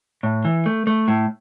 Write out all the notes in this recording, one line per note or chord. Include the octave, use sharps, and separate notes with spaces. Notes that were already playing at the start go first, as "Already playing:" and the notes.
A2
E3
A3
A3
A2